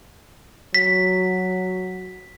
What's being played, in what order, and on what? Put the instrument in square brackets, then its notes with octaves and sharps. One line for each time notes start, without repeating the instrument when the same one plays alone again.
[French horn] F#3 [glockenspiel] B6